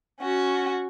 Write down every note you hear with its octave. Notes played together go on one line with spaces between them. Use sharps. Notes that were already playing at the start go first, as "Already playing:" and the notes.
C#4 F#4